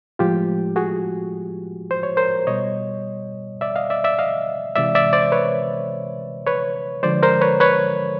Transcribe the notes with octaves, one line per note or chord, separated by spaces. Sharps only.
A2 F3 G#3 F4 G4
F#4 G#4
C5
C#5
A#4 C5
B2 G3 C#5 D#5
D5 E5
D#5 F5
D5 E5
D5 E5
D#5 F5
C3 E3 G#3 D5 E5
D5 E5
C5 D5
B4 C#5
B4 C#5
D3 F3 G#3 C5 D5
A#4 C5
B4 C#5
B4 C#5